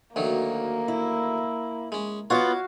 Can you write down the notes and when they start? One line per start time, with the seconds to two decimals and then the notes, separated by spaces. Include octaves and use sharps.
0.16 D2 D#3 F#3 A#3
0.88 E4
1.92 G#3 C#4
2.30 B3 F4 F#4 C#5 F5 D6